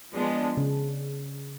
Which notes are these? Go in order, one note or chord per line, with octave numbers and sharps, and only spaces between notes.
F3 G#3 B3 D4
C#3